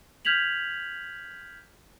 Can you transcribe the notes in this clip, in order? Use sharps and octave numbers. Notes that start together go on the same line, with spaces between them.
F6 G6 G#6 B6 F7 F#7